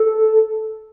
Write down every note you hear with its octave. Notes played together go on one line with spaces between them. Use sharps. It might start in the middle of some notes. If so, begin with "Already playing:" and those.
Already playing: A4